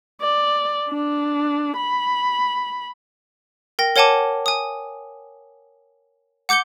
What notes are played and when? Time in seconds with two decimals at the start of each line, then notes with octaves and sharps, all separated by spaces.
0.21 D5
0.90 D4
1.77 B5
3.79 A#4 G5 A#6
3.96 A#4 C#5 F#5 G#5 A5 D6
4.46 G#5 D#6
6.49 F#5 D6 G6 C#7 G7